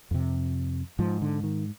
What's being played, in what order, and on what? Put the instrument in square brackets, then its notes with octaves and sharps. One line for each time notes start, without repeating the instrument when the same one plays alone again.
[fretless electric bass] F2 C3
G#2 F3
D3
D#3